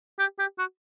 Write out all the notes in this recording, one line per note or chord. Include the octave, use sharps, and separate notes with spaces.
G4
G4
F#4